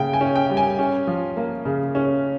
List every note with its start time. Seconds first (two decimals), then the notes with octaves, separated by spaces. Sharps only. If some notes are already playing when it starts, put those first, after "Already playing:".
Already playing: C#3 A#3 G5
0.13 G#5
0.21 C#4
0.36 G5
0.50 G3
0.57 G#5
0.79 C#4
1.07 F3
1.37 A#3
1.65 C#3
1.95 C#4